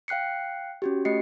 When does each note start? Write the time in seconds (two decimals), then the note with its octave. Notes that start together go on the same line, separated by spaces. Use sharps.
0.08 F5 G5 F#6 C7 C#7
0.82 C#4 F#4 G4
1.05 A3 G4 D#5 C7 C#7